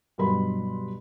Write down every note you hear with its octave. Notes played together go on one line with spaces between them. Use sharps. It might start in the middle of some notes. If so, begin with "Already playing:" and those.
G2 B2 F#3 B4 B5 C6